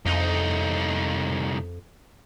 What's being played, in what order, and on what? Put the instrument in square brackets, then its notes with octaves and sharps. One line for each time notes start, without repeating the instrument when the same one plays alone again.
[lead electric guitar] C2 D#4 [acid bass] F2